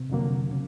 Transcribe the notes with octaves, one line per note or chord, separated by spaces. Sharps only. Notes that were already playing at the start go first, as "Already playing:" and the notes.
Already playing: C3
F2 D3 F#3 A#3
C#3